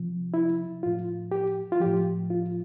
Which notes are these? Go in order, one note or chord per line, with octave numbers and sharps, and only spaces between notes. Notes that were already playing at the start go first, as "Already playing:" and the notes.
Already playing: C3 F3
E4
A2 F3 F4
G4
F4
A2 F3 G4
F4